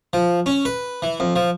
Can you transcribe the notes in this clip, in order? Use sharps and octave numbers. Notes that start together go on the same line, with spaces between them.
F3
C#4
B4
E3
F2
F3